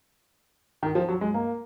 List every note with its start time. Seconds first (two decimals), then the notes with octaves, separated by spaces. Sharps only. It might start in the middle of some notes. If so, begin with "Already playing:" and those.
0.83 D#3
0.95 F3
1.09 F#3
1.21 G#3
1.34 A#3